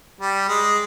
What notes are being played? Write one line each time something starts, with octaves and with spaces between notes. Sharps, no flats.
G3
G#3